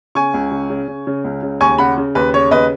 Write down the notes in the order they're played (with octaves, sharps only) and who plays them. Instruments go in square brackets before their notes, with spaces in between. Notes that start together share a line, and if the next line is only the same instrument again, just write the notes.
[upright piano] C#3 G#5 C#6
C#2
C#3
C#3
C#3
C#3
C#2
C#3
D#2 G#5 C#6
C#3 F#5 B5
C#3
D#2 B4
C#3 C#5
D#2 B4 D#5